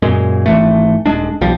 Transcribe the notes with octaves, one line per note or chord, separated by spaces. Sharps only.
F#2 A#2 G#3
G#1 E3 A3
D#1 D#2 G#3 D4
B1 F3 G3